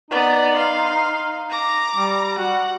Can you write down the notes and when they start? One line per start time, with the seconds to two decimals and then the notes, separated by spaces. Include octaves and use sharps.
0.11 B3 D#4 D5
0.57 F5 C6
1.50 A#5 D6
1.96 G3
2.38 F#4 F#5